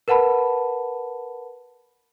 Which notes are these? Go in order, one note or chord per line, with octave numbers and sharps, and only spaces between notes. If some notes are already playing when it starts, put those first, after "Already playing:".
A#4 B4 F#5 A5 B5